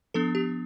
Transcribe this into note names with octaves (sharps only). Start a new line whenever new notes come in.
F3 B3 D4 A4
G4